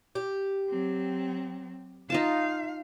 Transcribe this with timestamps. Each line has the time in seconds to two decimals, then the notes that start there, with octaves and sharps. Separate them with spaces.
0.15 G4
0.69 F#3 C4
2.10 D#4 F4 F5 A5